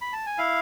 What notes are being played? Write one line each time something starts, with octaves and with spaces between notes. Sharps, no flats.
B5
A5
G#5
E4 F5